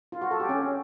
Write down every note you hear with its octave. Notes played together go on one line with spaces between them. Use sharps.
F4
F#4
A4
G4
C#4